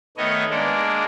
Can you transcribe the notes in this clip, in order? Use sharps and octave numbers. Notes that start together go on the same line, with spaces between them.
D#3 A3 B3 C#5 D#5
G#3 A#3 D4